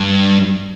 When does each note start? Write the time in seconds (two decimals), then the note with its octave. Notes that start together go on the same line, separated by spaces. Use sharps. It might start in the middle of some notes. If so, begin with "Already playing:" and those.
Already playing: G2